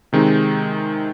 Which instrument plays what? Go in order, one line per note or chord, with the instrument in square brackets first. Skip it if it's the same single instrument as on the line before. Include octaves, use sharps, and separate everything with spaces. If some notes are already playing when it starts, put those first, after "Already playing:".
[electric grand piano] C3 D#3 G#3 C4 D#4